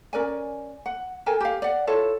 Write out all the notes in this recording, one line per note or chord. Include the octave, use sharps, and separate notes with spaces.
C#4 A#4 D5 G#5
F#5
A4 A#4 G5 G#5
G4 F5
D5 F#5
E4 F4 A4 C#5